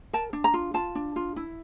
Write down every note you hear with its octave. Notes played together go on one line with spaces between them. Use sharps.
A#4 A5
D4
A#5
F4
F4 A5
D4
F4
E4